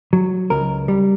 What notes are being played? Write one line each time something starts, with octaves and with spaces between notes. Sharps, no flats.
F#3
C#2 A#4
G3